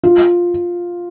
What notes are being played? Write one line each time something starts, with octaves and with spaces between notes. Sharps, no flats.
F4